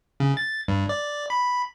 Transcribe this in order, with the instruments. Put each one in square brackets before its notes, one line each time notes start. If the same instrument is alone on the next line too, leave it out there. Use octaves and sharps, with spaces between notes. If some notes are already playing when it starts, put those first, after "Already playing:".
[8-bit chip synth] C#3
A6
G2
D5
B5